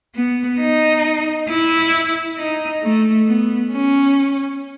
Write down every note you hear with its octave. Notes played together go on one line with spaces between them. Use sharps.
B3
D#4
E4
D#4
A3
B3
C#4